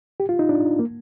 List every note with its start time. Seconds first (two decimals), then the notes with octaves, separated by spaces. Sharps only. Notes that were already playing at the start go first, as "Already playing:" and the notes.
0.20 G4
0.29 F4
0.39 D#4
0.49 D4
0.79 A#3